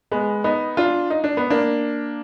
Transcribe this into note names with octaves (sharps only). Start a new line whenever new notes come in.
G#3 B3
B3 D#4
D4 F4
D#4
D4
B3
A#3 D4